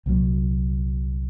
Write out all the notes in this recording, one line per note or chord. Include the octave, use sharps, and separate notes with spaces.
C2 A#2 F#3